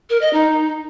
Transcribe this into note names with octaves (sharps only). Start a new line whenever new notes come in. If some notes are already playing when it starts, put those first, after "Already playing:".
A#4
D#5
D#4